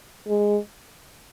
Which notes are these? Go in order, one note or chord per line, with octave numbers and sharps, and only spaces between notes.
G#3